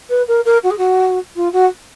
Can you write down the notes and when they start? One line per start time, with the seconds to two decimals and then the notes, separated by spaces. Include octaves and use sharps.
0.10 B4
0.28 A#4
0.45 A#4
0.63 F#4
0.71 G#4
0.78 F#4
1.36 F4
1.53 F#4